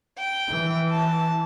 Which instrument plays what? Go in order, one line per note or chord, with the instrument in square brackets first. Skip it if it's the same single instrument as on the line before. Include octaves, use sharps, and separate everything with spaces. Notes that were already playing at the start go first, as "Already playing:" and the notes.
[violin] G5
[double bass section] E3
[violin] A5